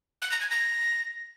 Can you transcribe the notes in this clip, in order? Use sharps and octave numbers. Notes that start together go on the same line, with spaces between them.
F#6
A#6
G#6
A#6